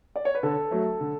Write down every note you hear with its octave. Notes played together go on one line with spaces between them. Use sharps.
D5
C#5
B4
D3 A4
F#3 A3
D3